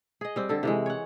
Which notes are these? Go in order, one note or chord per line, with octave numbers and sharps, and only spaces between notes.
G#4 D#5
G3 C4
D3 A4
C3 E3 G#3
C#5 F#5